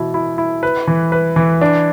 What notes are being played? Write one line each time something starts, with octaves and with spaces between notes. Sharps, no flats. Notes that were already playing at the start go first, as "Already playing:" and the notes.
Already playing: B2 E3 E4
E4
E4
B4
E3
B4
E3
D4